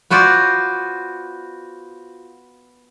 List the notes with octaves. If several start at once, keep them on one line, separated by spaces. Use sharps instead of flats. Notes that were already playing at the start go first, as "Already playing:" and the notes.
B3 F4 F#4 C5 D5